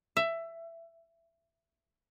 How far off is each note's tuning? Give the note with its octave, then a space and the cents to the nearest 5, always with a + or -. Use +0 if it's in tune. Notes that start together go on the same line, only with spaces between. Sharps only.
E5 +15